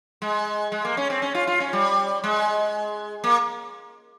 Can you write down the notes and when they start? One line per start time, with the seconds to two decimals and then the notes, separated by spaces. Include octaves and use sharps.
0.22 G#3
0.72 G#3
0.85 A#3
0.97 C#4
1.10 C4
1.22 C#4
1.35 F4
1.47 F4
1.60 C#4
1.73 G3
2.24 G#3
3.24 A#3